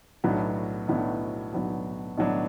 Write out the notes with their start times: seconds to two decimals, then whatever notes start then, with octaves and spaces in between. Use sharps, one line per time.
0.24 B1 A2 F#3 B3 D4
0.88 B1 A2 F#3 B3 D4
1.53 B1 A2 F#3 B3 D4
2.18 B1 A2 F#3 B3 D4